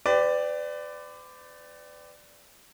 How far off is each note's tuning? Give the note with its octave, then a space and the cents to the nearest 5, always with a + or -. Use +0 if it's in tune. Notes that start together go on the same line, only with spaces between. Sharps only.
G4 +0 B4 +40 D5 +5